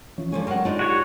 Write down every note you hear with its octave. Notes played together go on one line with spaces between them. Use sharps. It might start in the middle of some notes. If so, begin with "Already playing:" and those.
E3 F3 C#4
D3 F3 G#3 C#5 G#5
F#3 C4 A#4 F#5
D4 D#4 F4 A4
F#4 G4 C#5